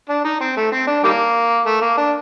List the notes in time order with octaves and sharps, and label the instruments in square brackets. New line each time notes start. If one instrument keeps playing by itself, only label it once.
[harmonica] D4
D#4
C4
A3
C4
D4
D#3 G3 A#3
A3
A#3
D4